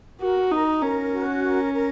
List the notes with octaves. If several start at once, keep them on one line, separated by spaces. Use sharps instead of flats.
F#4 A#4
D#4 A#5
C#4 A#4
F#4
A#4
A#4